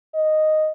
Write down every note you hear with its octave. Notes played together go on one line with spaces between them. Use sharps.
D#5